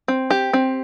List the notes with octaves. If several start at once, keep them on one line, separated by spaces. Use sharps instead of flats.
C4
G4
C4